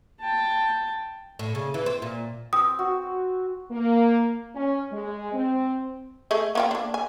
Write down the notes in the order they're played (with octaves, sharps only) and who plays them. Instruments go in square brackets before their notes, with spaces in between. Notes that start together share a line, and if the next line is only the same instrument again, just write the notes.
[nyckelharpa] G5 A5
[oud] A2
C#3
E3
C4
A#2
[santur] C4 [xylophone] D#6
[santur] F#4
[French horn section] A#3
C#4
G#3
C4
[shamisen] A3 G#4 D#5
A#3 F4 G5
A#3 D4
G#5